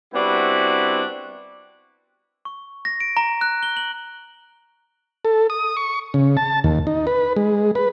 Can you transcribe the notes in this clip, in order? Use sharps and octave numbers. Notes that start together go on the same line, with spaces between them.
G3 B3 C4 D4 E4 F#4
C#6
A#6
D7
A#5
F#6
G7
F#7
A4
D#6
C#6
C#3
A5
D#2
D#4
B4
G#3
B4